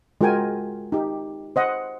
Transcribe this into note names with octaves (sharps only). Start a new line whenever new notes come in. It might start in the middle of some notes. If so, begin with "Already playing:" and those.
G#3 F4 F#4 A#4 G5 G#5
D#4 G4
C5 D#5 F#5